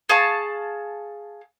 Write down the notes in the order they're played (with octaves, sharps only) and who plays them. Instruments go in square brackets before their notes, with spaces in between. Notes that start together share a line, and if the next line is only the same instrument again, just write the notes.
[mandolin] G#4 F5 A5 C#6